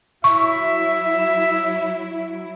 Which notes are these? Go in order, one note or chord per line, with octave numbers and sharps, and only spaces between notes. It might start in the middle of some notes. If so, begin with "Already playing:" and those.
F#3 E4 E5 C#6